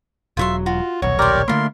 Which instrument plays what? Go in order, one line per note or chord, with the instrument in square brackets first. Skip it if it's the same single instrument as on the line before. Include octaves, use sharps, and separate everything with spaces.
[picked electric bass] E1 C3 F#3 [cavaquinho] F4 E5 C6
[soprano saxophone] F4 [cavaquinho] F#4
[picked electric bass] D#1 B1 [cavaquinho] F#4 [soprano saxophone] C#5
[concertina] G4 A#4 D5 [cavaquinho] A#5 C6
[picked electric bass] D3 A3 A#3 [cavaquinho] E4 F4 [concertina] A#4 C6